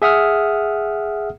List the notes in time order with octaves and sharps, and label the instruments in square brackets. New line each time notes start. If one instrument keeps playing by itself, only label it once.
[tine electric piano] G#4 E5 F#5 D#6 F6